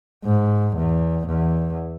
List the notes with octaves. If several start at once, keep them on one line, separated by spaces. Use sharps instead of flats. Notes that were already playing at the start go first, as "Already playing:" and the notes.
G#2
E2
E2